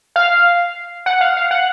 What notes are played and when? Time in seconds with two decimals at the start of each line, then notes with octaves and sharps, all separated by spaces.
0.16 F5
1.06 F#5
1.21 F5
1.37 F5
1.51 F#5